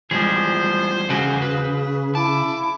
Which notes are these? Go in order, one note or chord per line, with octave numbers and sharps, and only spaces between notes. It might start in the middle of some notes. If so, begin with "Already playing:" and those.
E3 F3 G3 G#3 G#4 C5
E2 C#3 F#4 G#4 G#5
G#4 B4
E4 A5 D6